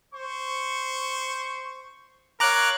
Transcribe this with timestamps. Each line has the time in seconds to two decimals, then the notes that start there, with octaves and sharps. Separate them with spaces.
0.14 C5 C#6
2.40 A#4 C#5 F5 A#5 D6 F#6